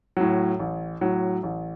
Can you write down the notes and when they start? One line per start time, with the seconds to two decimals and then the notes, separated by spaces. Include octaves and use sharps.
0.17 A2 F#3
0.59 A1
1.01 A2 F#3
1.43 A1